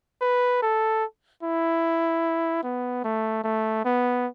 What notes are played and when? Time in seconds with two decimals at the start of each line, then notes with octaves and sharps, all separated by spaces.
0.21 B4
0.62 A4
1.43 E4
2.64 B3
3.04 A3
3.44 A3
3.85 B3